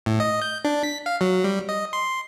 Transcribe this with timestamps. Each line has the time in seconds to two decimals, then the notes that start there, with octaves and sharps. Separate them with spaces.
0.06 A2
0.20 D#5
0.42 G6
0.65 D4
0.83 B6
1.06 F5
1.21 F#3
1.44 G3
1.69 D#5
1.93 C6